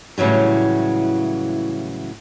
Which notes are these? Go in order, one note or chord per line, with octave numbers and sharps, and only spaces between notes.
A2 C#3 E3 F#3 G3